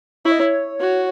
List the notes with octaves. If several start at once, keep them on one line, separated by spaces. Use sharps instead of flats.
E4 C#5
D#5
C#5
F#4